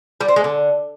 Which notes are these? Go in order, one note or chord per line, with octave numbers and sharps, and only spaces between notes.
G3
C4
G#3
D3